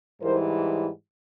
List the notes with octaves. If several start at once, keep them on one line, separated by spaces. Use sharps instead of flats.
G#2 E3 G3 A#4 C5